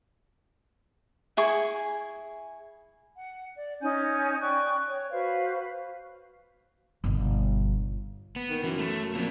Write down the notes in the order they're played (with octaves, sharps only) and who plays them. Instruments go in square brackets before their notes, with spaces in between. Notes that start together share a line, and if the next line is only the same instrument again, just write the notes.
[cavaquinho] E4 G#4 C#6
[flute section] F#5
D5
C#4 D#4 G#5 G6
D5 G5 C#6 F#6
C#5
F#4 B4 C5 F5
[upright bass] G1 B2
[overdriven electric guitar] B3
[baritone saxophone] D#3
[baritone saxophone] F#2 [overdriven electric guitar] E3
[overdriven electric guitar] A3
[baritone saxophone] F2 [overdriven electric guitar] F3 A#3